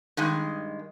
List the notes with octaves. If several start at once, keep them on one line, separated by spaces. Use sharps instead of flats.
G2 D#3 G#3